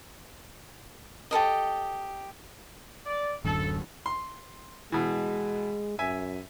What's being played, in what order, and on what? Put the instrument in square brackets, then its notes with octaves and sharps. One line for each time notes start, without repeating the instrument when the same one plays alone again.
[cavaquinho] G4 A4 A#4 D#5
[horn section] D5
[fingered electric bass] D1 F#2 D3 [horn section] A4
[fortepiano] C6
[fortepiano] B2 E3 [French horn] G#3
[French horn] F#2 [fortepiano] E5 G#5